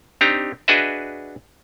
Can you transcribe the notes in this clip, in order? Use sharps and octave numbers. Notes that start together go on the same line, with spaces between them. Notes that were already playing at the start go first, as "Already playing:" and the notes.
C4 D4 D#4 G4 A#5
D4 F#4 G#4 B4 D#5 E5